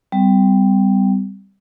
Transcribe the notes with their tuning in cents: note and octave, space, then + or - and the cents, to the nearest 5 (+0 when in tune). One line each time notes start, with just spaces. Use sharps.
G3 +0 C4 -45